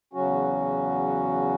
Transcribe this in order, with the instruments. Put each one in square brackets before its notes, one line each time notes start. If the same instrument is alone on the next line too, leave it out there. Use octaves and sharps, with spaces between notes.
[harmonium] E2 C#3 F#3 C#4 F#4